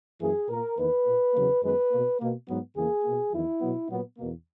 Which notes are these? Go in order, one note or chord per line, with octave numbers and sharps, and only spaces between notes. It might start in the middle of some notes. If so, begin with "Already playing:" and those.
F#2 E3 A#3 G#4
A#2 A#3 A#4
E2 D#3 A#3 B4
A#2 A#3
E2 C#3 F#3 A#3
F#2 D#3 G#3 B3 B4
B2 A#3
B2 A#3
G#2 F#3 B3
E2 C#3 E3 A#3 G#4
B2 A#3
E2 D#3 F#3 E4
B2 F#3 B3
A#2 F#3 B3
E2 B2 A#3